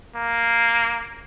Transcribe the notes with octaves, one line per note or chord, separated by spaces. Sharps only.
A#3